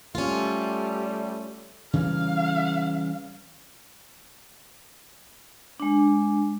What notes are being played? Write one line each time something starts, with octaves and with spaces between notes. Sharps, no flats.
G3 A3 C#4 F4
C#3 E3 G3 F5
G#3 D4